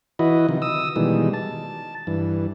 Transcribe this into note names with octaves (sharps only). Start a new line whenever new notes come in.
E3 E4 F#4 B4 D#5
C3 D#3 F3
D#6 E6
B2 D#3 E3 G3 G#3
A5
G2 E3